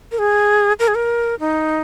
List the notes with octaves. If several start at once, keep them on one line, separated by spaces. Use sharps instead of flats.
A#4
G#4
A#4
G#4
A#4
D#4